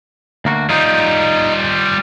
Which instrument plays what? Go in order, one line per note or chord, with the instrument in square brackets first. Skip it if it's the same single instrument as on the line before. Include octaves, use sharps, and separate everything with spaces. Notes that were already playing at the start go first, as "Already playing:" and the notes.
[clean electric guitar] D2 A#3 F#4
[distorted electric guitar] G3 F4 [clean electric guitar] D#4